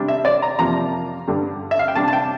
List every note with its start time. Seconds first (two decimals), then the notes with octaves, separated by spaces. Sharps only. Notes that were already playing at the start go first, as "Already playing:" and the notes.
Already playing: C3 G3 D4
0.08 E5
0.25 D5
0.42 A#5
0.59 F2 C3 F3 A#3 A#5
1.27 G2 D3 G3 D4
1.71 E5
1.79 F5
1.88 G5
1.95 C3 G3 D4 A5
2.08 A5
2.13 G5